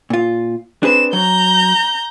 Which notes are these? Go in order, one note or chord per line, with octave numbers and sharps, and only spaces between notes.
A#2 F4
C4 D4 G#4 B4 E7
F#3 A#5 G6